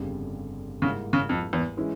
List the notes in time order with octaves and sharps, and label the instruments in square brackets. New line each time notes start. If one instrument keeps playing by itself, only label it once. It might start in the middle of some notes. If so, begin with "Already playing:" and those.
Already playing: [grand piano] G1 F2 C#3 G3
[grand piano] G#2 G3 A#3 E4 [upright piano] C#3
[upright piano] C#3
F2
E2
[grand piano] E3 G#3 C#4 E4